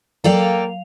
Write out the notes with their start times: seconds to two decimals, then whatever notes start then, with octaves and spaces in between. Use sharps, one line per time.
0.24 F#3 A#3 A4 D5 F5 G5 F7